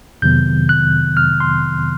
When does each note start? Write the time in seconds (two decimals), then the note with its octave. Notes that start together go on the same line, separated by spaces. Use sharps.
0.22 F2 C3 D#3 F#3 B3 G6
0.69 F#6
1.17 F6
1.40 C6